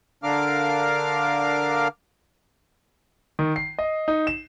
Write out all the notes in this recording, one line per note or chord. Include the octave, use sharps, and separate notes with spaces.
D3 D4 A#4 F5 D6 F6
D#3
C7
D#5
D#4
E7